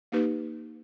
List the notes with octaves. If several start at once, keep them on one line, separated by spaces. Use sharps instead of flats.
A#3 D#4 G4 B4